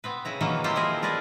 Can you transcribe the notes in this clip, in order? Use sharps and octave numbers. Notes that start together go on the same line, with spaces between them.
B3 C4 B4
C#3 E4 A#5
D#3 E3 F#3 A#3 C#4
C4 E4 F4 G4 C5
F3 E4 G#4 A#4
F4 A#4 B4 D5 D#5